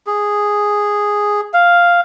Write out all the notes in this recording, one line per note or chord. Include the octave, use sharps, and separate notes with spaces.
G#4
F5